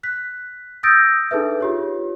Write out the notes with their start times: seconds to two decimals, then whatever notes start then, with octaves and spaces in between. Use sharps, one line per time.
0.03 F#6 B6
0.83 D#6 E6 G6 A6 A#6 D7
1.31 D4 D#4 G#4 A4 B4 E5
1.60 F4 G4 C#5